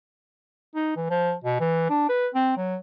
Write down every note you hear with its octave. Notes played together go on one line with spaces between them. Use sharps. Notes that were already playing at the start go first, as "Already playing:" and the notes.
D#4
E3
F3
B2
E3
D4
B4
C4
F#3